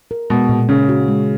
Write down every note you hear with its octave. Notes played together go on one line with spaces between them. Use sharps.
A#4
B2 G#3
A#2
C#3 C#4
F#4
G#3